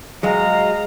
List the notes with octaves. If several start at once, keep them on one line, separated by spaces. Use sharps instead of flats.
F#3 G#3 D#5 F5 A#5